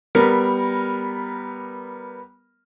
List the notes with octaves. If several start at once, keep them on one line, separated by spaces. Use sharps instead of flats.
G3 B3 A#4